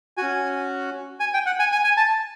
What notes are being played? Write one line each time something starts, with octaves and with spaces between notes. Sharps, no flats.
C#4 F#4 G#5
G#5
G5
F#5
G#5
G#5
G#5
A5